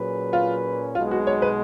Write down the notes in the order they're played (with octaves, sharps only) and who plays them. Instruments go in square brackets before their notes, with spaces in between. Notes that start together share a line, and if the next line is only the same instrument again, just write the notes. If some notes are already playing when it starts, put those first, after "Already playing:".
Already playing: [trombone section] A#2 F#3 C#4 G#4 B4
[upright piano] F4
[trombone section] B1 B2 G#3 [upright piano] F4
[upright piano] F#4
C#5
B4